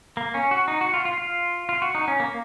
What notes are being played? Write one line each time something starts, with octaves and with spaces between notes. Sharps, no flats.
A#3
C#4
F#4
D#4
F#4
F4
F4
F4
F4
F#4
D#4
C#4
A#3